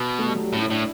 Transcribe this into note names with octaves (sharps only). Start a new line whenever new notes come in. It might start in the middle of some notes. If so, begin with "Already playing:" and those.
Already playing: B2
A3
G3
F#3
G3
A2 C#4
E4
A2 D4